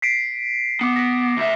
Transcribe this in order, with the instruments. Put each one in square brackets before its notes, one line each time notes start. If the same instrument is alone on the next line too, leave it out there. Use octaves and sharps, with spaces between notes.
[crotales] B6 C7 D7
[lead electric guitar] B3 [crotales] D6 C#7
[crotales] A#6 B6
[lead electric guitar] D2 E5